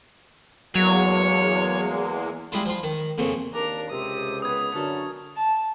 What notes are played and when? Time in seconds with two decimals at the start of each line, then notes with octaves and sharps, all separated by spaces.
0.75 E2 F#3 G#3 A#3 C#5
2.52 G3 G#3 E4 F4
2.65 F3 F4
2.83 D#3
3.18 F2 A#2 C#3
3.54 D#2 A#3 D4 A#4 A#5
3.90 C#2 C3 D#6
4.42 B3 B4 D#6 G#6
4.75 F#2 D3 F#3 C#4 A4
5.37 A5